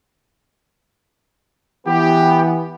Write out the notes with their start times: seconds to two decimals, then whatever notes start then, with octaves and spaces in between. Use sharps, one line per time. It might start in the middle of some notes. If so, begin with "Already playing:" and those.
1.87 E3 B3 G4